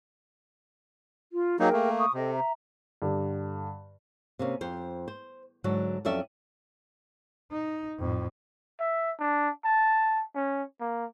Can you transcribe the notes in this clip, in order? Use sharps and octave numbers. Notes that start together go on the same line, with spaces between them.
F4
F#3 A#3 D#4 G#4 A#4 G5
A3 A#3
C#6 D#6
C3 A4 D#5 G5
E5 A#5
G2 D3 G4
C3 A#3 C#4
F2 C5
C5
G#2 D3 F#3 D4 F#5
F2 F#3 C#4 A4 D5 E5
D#4
F2 A2
E5
D4
A5
C#4
A#3